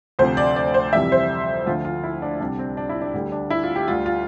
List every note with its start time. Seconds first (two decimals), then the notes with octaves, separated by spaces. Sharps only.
0.19 D2 C3 F3 C5
0.37 D5
0.56 D5
0.74 C5
0.93 F2 C3 E3 G3 E5
1.12 C5
1.66 D2 D3 F3 F4
1.85 F4
2.03 E4
2.22 D4
2.40 C2 C3 G3 D4
2.59 C4
2.77 D4
2.89 E4
3.02 D4
3.14 D2 D3 G3
3.32 D4
3.50 E4
3.63 F4
3.75 G4
3.87 D2 D3 G3 F4
4.06 F4